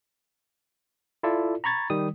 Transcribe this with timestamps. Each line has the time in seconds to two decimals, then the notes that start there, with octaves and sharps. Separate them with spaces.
1.23 E4 F4 A4 D5
1.64 A#5 B5 C#6 G#6 A6
1.90 D#3 G3 D#6